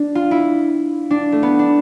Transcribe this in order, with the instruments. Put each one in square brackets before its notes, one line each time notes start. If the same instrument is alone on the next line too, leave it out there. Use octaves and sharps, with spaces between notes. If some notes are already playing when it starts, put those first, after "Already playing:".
Already playing: [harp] D4
F4
E4
D4
A3
B3
D4